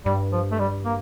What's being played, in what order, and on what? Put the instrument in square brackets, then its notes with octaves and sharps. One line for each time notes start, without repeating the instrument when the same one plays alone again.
[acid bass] G2 [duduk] G3
[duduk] F3
A3
G3
A#3